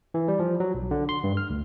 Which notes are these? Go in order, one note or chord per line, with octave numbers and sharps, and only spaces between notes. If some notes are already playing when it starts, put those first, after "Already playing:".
E3
G3
F3
F#3
B1
D3
C6
G2
F6
D2